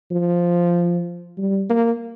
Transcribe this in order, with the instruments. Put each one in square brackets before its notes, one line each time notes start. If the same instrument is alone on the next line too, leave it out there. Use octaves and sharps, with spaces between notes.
[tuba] F3
G3
A#3